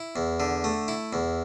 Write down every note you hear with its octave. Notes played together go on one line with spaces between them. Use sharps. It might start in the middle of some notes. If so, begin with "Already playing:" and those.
Already playing: E4
E2
D3
A3
E4
E2